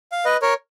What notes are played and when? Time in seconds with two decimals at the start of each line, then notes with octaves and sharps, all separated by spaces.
0.12 F5
0.25 B4 D#5
0.42 A#4 C#5